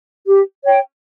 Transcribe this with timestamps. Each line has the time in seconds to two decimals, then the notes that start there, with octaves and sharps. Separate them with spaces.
0.27 G4
0.65 C#5 G5